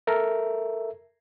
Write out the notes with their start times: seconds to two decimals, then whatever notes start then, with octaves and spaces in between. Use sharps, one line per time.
0.07 A4 A#4 E5